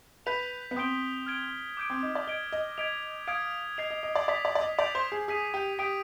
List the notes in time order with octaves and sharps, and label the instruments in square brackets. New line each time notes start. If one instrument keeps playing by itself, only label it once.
[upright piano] B4 [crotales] G6 B6 F7
[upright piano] B3
[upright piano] C4 [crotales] D#6 G6 D7 G7
[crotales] F6 G#6 D7 G7
D6 G6 D7
[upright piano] C4
D#4
D5
[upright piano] D#5 [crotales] G#6 D7 G7
[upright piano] D#5
[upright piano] D#5 [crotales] G#6 B6 D7 F7
[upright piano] F5 [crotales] D#6 G#6 D7
[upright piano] D#5 [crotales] G#6 C7 F7
[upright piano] D#5
D#5
D5
[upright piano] D5 [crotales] D#6 B6 F7
[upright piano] D5
D5
D#5
[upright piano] D5 [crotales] G6 D7 F7
[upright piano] C5
G#4
[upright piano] G#4 [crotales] D#6 B6 D#7
[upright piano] G4
[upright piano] G4 [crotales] D#6 B6 D7